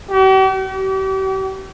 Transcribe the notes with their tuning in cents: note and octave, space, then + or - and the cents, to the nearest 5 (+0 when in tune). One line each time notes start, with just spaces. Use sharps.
G4 -45
G4 -40